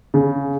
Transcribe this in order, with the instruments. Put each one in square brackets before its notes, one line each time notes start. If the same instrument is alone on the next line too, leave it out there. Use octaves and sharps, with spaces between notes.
[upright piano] C#3